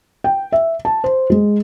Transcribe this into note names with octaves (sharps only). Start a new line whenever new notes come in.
G5
E5
A5
C5
G#3